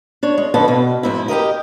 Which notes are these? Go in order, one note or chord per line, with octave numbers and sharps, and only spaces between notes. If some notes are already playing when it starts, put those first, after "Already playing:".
D4 C#5
G#3
F2 D3 B4 A5
B2
F2 G#2 E4
G4 G#4 A#4 D#5